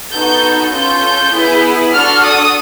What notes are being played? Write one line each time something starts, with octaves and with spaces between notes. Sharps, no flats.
B3 D#4 F#4 A4 G6
C#4 F4 A4 G6
B3 E4 G#4
D4 F#4 A4 F6
D#6